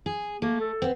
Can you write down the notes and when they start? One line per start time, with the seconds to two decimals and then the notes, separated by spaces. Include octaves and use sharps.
0.06 G#4
0.42 A3 A#3
0.61 A4
0.82 B3 C4